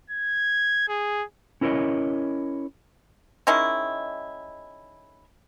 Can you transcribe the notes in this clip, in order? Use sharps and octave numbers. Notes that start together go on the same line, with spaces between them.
G#6
G#4
C#4 E4 A#4 C5 C#5 D#5
D#3 G#3 C#4 E4